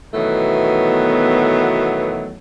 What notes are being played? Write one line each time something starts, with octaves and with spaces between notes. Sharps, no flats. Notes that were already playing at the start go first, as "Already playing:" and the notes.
B2 D#3 E3 F#3 A3 B3